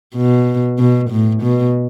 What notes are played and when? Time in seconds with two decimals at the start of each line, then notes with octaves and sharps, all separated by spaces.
0.15 B2
0.79 B2
1.10 A2
1.43 B2